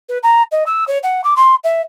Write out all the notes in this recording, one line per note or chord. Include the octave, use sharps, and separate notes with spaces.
B4
A#5
D#5
E6
C#5
F#5
D6
C6
E5